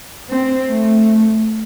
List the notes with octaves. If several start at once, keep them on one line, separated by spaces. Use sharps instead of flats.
C4
A3